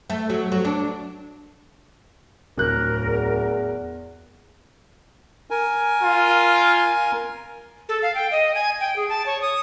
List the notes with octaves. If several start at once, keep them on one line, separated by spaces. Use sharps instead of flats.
A3
F#3
F#3
D4
D1 A#4 F#6
E2
A#4 G#5
F4
A4
F5
G5
D#5
G#5
G5
G#4
A5
C#5
D#6